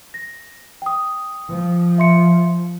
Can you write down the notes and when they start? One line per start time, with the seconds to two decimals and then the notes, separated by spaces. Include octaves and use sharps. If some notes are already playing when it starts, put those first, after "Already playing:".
0.14 A#6
0.82 G5 D#6
1.51 F3
1.98 E5 C6 C#7